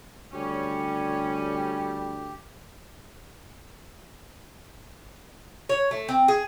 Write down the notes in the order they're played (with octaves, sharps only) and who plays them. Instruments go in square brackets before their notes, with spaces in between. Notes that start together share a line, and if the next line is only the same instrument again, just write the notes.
[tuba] D2 [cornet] G3 [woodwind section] C#4 [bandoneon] G4
[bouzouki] C#5
A3
C4
G#4